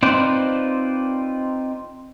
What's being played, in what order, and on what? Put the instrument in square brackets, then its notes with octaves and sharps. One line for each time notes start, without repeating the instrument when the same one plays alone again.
[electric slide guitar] C4 D#4 F4 B4 C5 D5